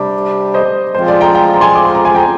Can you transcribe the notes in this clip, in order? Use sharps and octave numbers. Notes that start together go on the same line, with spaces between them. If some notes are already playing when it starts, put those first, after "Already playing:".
Already playing: C3 G3 D4 G4 D5
C5 D#5
F3 G#3 C4 F4 C5
D5
G5 A#5
G5 A#5
A#5
G#5 C6
D6
C6
A#5
G#5 C6
G5 A#5